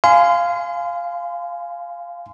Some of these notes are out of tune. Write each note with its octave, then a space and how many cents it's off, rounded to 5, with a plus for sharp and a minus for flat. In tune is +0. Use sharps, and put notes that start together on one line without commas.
F5 -5 G#5 +5 C6 -35